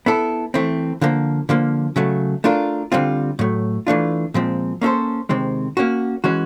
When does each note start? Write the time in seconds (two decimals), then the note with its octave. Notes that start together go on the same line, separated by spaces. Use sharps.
0.06 B3 E4 A4
0.54 E3 A3 C4
1.01 D3 F3 A#3
1.49 D3 F3 A#3
1.96 C#3 F#3 A3
2.44 A3 D4 F4 A#4
2.92 D3 G3 C4 F4
3.39 A2 F#3 A3
3.87 E3 A3 D4 F4
4.34 A#2 F3 G#3 C4
4.81 A#3 C#4 E4 A4 C5
5.29 C3 D#3 G#3 C4
5.77 A#3 C#4 F#4
6.24 E3 G#3 C#4 F#4